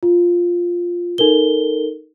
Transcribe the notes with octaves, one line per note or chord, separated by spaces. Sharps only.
F4
D#4 A4 A#4 G7